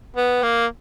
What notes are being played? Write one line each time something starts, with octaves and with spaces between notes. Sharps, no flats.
B3
A#3